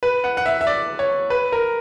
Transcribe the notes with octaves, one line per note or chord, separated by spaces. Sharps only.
B4
F#5
F#5
E5
E5
D5
C#5
B4
A#4